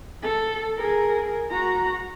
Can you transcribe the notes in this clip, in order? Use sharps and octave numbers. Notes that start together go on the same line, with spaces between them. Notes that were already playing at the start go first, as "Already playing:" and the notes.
A4
G#4 A#4
F#4 A#5